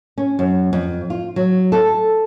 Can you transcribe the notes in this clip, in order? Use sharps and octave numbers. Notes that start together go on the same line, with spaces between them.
C#4
F#2
F2
F4
F#3
A4